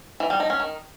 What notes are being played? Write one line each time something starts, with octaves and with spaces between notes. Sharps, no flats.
E3
G3
D#4
C#4
D#3